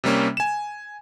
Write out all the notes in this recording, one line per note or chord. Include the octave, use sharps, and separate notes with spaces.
C3 G3 A#3 C#4
G#5 E7